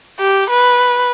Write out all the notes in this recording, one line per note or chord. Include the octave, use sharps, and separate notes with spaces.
G4
B4